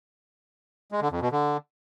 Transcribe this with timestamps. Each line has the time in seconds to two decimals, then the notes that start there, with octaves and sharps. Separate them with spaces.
0.92 G#3
1.02 D3
1.12 F2
1.22 B2
1.32 D3